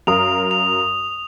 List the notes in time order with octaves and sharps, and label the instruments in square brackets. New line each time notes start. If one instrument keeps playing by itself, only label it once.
[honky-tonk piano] F#2 A#4 F5 [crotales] D#6 F7
[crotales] F7